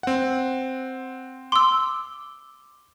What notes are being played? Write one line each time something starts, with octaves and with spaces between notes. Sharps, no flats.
C4 F#5
C6 D6 E6